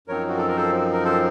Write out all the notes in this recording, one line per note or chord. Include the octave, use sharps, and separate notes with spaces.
F#2 F3 C4 D#4 A#4 C#5
F#4
A4
A#4
A4 C5
A#4
A4 C5